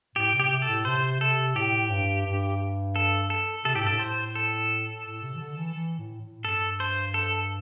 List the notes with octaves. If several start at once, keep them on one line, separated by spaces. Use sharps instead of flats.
A2 G4
C3
G4
C3
A4
A2
C3 C5
C3 A4
A2 G4
G2
G2
A4
A4
C3 A4
A2 G4
G2
A4
A2
C5
A4
A2
C3
E3
D3
E3
E3
A2
A2
G2 A4
C5
A4